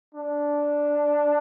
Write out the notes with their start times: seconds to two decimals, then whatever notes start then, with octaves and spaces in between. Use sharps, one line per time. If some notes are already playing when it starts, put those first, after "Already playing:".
0.15 D4